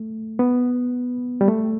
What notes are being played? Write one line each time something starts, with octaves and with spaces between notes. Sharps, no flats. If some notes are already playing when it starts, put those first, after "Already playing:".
Already playing: A3
B3
G3
A3